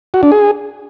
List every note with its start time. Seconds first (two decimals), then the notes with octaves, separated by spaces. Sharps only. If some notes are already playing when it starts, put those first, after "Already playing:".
0.14 F#4
0.23 D4
0.32 G#4